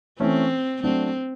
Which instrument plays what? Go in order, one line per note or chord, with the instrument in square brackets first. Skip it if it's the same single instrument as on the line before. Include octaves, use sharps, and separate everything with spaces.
[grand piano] E3 A3 C#4 [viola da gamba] C4
[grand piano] F#3 A3 D4 [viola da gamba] C4